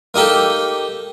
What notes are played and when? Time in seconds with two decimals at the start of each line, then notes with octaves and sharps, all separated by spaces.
0.14 A#3 D#4 G4 A4 G5